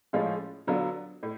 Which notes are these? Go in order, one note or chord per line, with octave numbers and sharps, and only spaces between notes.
A2 F3 G#3 C#4 F4
D3 F#3 B3 D4 F4
A2